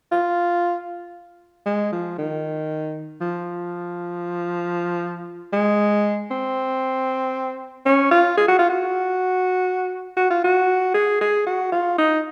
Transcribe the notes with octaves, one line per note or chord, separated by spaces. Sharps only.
F4
G#3
F3
D#3
F3
G#3
C4
C#4
F4
G#4
F#4
F4
F#4
F#4
F4
F#4
G#4
G#4
F#4
F4
D#4